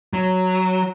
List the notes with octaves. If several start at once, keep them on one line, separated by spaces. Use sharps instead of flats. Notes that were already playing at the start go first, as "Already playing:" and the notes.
F#3